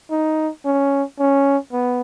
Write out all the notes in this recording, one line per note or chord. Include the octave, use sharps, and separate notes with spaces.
D#4
C#4
C#4
B3